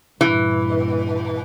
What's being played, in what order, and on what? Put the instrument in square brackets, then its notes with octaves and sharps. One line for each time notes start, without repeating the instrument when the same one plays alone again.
[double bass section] G2 A#2 [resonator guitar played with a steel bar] E3